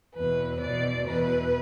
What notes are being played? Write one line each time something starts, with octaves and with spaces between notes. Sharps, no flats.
E2 B2 B4
E2 B2 D5
E2 B2 B4